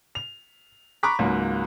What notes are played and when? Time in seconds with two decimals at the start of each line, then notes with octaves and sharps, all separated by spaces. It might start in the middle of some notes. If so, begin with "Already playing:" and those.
0.15 F7
1.03 A#5 B5 C#6 D6 F#6 B6
1.19 C#2 G#2 F#3 A#3